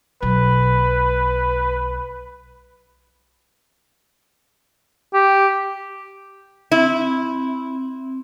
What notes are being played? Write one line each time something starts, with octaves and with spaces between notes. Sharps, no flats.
B1 B4
G4
C4 E4